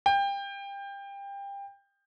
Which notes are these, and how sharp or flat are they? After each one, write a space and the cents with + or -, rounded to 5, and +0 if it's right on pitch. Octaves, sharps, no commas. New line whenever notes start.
G5 +25